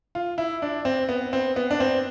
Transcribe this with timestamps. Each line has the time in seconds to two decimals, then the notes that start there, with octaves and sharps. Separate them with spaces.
0.15 F4
0.38 E4
0.62 D4
0.85 C4
1.09 B3
1.33 C4
1.56 B3
1.71 D4
1.80 C4